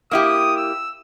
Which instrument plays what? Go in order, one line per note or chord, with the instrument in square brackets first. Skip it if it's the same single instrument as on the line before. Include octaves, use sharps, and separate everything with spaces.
[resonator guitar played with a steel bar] A#3 E4 G4 [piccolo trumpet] D#6
[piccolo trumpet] E6